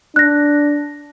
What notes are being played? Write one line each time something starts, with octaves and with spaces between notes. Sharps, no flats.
D4 F#6 A#6